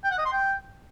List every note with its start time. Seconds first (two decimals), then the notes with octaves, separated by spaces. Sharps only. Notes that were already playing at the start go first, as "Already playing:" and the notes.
0.04 G5
0.11 F#5
0.18 D#5
0.25 C6
0.32 G5